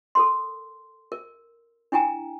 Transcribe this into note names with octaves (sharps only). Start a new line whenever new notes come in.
A4 A#4 C6
A#4
D4 E4 G5 G#5 A#5